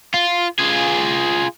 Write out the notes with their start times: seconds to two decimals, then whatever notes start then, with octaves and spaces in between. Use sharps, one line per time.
0.14 F4
0.59 F4 G#4